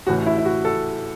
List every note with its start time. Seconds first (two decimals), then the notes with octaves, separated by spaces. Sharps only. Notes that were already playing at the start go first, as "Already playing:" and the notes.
0.07 A1 A2 E3 F#4
0.26 E4
0.38 E4
0.45 F#4
0.65 A4